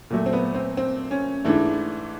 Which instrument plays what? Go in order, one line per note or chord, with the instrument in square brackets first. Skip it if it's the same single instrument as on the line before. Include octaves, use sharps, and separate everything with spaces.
[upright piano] A#2 F#3 A3
C4
B3
C4
C4
C#4
G#2 E3 A3 D4